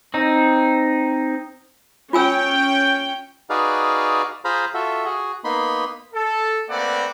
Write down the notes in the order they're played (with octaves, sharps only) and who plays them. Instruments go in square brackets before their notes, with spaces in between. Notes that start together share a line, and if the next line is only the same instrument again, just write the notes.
[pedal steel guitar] C4 D#4
[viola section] C#4 G5 [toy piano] F4 G#5 E6
[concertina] D#4 F#4 G#4 B4 D5 F5
F4 G#4 C5 F5 A#5 B5
F4 F#4 A4 E5
F#4 G#4
A#3 B3 D#4 B5 C6
[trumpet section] A4
A3 A#3 C4 B4 D5 F#5